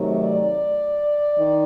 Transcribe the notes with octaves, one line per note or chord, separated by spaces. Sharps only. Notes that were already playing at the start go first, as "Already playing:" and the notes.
Already playing: C3 D#3 F#3 A3
D5
D#3